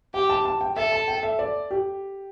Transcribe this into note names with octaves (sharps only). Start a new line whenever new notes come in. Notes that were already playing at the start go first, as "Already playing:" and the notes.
G4 G5
A5
A5
G5
A4 E5
A5
G5
E5
D5
G4